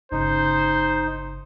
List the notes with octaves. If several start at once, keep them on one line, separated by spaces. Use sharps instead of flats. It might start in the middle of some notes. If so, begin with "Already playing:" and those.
G1 C#3 D#4 C5